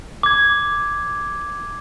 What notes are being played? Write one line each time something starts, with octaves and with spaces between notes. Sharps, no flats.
D6 G#6